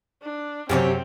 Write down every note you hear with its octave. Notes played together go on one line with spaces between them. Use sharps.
D4
F#2 C3 C4 G4 B4 C#5